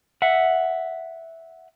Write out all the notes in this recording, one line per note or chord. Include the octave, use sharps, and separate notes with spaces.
E5 F#5